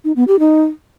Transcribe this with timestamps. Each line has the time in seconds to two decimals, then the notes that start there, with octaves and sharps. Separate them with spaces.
0.05 D#4
0.16 B3
0.28 G4
0.39 D#4